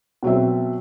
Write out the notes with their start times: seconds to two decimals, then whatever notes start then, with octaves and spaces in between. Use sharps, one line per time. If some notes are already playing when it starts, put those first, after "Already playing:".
0.23 B2 F#3 C4 E5